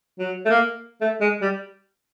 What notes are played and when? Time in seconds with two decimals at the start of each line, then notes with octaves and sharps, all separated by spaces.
0.19 F#3
0.45 A3
0.50 A#3
1.01 A3
1.21 G#3
1.41 G3